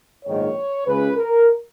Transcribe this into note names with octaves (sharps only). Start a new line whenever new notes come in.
A#1 G#2 D#3 C#5
C#2 C#3 B4
A#4